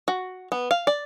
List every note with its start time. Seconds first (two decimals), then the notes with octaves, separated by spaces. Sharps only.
0.08 F#4
0.52 B3
0.71 F5
0.87 D5